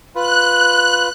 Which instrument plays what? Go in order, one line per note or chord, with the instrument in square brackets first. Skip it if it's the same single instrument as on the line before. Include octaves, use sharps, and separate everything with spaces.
[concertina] F4 B4 [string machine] F#6